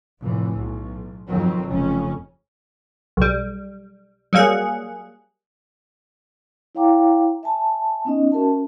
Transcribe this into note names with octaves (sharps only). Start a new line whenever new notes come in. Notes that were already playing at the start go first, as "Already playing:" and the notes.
F1 A2 E3
B1
F2 B2 D#3 F#3 C4
F1 F2 C#3 C#4
B1 G3
F#3 G3 A#3 G#4 F#5
E4 C#5 F5 G5 A#5 D6
E5 G#5 A5
B3 C#4 D#4 D#5
C#4 F#4 A#4 E5 A5